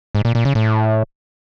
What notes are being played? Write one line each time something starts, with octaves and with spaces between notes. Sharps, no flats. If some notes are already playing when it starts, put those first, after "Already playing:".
G#2
A#2
A#2
C#3
A2